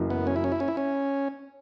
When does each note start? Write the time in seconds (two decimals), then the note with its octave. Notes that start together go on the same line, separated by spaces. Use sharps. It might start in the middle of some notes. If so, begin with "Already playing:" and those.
Already playing: F#1 F#2 E3
0.10 B3
0.27 C#4
0.36 E4
0.44 C#4
0.52 E4
0.60 C#4
0.68 E4
0.77 C#4